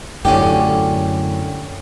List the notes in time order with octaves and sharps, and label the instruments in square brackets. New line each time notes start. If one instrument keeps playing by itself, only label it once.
[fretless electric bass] F#2 A2 D3 [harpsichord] C#4 G4